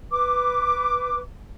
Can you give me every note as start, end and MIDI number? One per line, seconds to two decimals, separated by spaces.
0.10 1.19 71
0.10 1.19 86